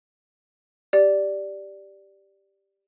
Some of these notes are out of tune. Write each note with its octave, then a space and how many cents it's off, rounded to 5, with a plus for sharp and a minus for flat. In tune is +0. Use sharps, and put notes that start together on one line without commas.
G4 +0 D5 +0